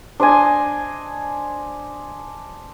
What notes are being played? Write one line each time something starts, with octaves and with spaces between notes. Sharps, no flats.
D4 C5 D#5 G#5